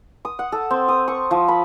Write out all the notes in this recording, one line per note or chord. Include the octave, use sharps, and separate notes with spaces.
D#6
F#5
A4
C4
D#6
C#6
F3
B5